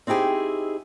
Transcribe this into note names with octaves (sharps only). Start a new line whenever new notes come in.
C4 D#4 E4 G4 G#4